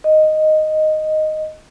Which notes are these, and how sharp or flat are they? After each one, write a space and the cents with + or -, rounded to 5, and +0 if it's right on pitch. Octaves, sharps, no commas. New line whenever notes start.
D#5 -5